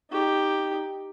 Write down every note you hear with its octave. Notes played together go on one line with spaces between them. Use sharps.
D#4 G4